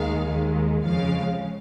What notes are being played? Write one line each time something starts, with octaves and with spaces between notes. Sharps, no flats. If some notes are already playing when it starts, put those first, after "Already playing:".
Already playing: D#2 D#3 G#3 F5
D#2 D#3 G#3
F2 C#3 F3 G#3 F5